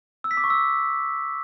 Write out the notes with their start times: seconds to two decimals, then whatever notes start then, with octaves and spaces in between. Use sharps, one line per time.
0.24 E6
0.31 B6
0.37 D6
0.44 C#6
0.50 E6